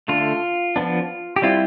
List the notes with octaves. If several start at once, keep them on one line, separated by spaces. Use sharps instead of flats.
D3 A3 D4 F4
F3 B3 D4
G4
G3 C4 E4 F4